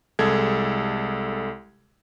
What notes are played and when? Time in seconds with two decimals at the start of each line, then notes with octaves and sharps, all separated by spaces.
0.19 C2 G#3 A4 G#6